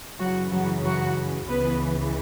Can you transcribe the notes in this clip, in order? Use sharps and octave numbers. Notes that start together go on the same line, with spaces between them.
F#2 C#3 E3 F#3 F#4
F#3 F#4
F#3 F#4
C#2 C#3 E3 B3 B4